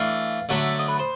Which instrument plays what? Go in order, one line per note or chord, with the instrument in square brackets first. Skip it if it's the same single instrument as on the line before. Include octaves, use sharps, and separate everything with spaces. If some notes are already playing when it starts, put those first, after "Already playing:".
Already playing: [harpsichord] E3 A3 D4 [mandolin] F5
[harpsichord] D3 F#3 A3 D4 [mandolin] E5
[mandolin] D#5
B4
C5